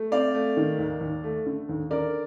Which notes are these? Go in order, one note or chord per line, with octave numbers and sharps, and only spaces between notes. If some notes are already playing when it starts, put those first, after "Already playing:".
Already playing: A3
C4 D5 F5
A3
D#3
D#2
D#2
A3
D3
D#2
D3 A#4 D5